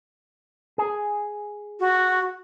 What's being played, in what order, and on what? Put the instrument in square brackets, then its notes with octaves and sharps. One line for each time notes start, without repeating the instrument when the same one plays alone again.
[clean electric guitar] G#4
[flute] F#4